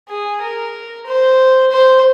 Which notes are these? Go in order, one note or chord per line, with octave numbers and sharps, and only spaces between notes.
G#4
A#4
C5
C5